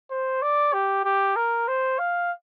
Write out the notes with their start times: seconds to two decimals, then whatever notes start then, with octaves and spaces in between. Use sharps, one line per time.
0.10 C5
0.42 D5
0.73 G4
1.04 G4
1.36 A#4
1.67 C5
1.99 F5